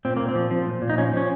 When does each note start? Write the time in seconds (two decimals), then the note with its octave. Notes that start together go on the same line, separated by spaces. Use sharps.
0.05 A#2 C4
0.16 A#2 A#3
0.29 C4
0.35 F3
0.51 F3
0.67 A#2
0.82 A#2
0.89 D#4
0.98 F3 C#4
1.13 F3 C#4